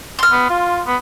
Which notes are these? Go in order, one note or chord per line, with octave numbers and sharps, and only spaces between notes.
C6 F6
B3
F4
B3